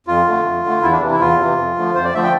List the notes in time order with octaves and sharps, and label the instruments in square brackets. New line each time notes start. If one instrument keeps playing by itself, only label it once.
[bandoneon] F2 F4
D3 A3
F2
D3 A3
E2 E4
D4
C3 E3
E4
E2 F4
C3 E3
F2
D3 F3 A3
F2 C5
D5
D3 F3 A3 E5
G5